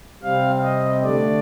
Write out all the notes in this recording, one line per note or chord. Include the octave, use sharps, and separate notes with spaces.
C3 G3 C4 F5
D#5
D3 A3 D4 D5